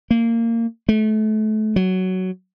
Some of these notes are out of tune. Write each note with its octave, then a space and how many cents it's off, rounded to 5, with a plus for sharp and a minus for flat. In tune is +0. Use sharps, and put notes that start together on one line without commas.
A#3 -20
A3 -30
F#3 +10